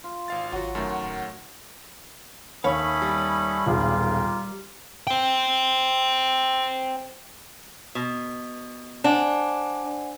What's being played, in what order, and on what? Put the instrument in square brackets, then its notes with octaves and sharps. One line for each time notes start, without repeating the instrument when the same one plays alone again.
[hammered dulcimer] F4
[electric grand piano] G#1 F5 A6
[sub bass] G#1 [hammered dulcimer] F#3 [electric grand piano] F4 F#4 [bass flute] F#5
[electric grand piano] F#2 D#3 [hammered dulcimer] A3
[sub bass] D1
[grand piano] D#2 [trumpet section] A3 C#4 D#6 [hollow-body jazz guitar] C#5 F5 [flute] B5
[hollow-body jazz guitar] G3
[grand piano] D#1 B1 G#4 [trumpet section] F4 G4 A#4
[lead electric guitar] C5 G5
[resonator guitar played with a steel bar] B2
[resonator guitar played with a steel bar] D4 [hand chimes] C5 F#5 G#5